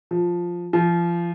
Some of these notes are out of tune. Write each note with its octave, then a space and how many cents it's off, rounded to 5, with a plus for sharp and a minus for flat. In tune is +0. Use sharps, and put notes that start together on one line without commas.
F3 +5
F3 -25